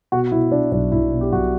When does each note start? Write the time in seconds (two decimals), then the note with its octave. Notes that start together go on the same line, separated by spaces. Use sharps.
0.12 B2 F#4
0.32 B2 E4
0.52 B2 D4
0.72 B1 D4
0.92 B1 E4
1.12 B2
1.21 G4
1.32 B1 F#4